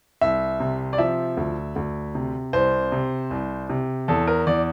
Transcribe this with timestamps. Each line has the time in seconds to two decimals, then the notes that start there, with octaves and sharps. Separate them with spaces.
0.21 C2 E5
0.60 C3
0.93 D5
0.98 F3 E5
1.37 D2
1.76 D2
2.15 C3
2.53 C2 C5
2.92 C3
3.31 C2
3.70 C3
4.08 E2 A4
4.27 A#4
4.47 E2 D5